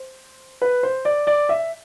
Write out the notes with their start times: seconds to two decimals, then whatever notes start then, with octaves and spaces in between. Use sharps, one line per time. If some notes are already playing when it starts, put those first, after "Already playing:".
Already playing: C5
0.62 B4
0.83 C5
1.05 D5
1.27 D5
1.49 E5